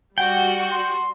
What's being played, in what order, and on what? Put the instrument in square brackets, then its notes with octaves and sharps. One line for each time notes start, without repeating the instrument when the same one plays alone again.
[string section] G3 F#4 [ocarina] F#5 [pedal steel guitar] G5
[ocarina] C6